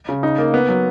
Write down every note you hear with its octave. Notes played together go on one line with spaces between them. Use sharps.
C#3
D#4
A#3
B3
F#3